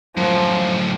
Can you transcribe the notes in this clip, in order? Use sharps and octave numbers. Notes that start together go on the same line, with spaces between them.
F#2 A2 F3